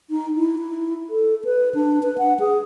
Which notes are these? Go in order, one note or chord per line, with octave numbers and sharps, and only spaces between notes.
D#4
E4
E4
A4
B4
D4
B4
F#5
G#4